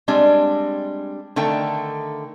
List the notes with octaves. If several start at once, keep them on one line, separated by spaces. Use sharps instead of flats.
G3 G#3 C4 D4
D3 D#3 A3 G5